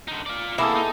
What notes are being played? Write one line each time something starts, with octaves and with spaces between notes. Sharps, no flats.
D3 D#4
F4 D5
C3 E3 A#3 B3 E4 G#4 A4
D#4